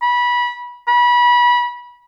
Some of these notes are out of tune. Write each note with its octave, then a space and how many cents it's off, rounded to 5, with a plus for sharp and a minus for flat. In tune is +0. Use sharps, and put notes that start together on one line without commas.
B5 -25
B5 -25